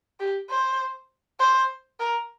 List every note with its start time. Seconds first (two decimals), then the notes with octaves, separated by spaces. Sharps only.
0.20 G4
0.49 C5
1.39 C5
1.99 A#4